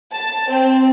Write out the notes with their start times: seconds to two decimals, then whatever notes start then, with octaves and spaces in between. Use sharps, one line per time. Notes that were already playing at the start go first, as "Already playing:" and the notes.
0.12 A5
0.49 C4